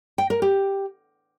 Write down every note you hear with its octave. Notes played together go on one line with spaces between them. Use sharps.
G5
A#4
G4